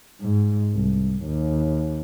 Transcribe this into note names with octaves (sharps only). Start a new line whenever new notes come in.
G#2
C2
D#2